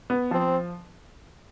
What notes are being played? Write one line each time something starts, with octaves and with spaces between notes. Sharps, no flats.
B3
F3 C4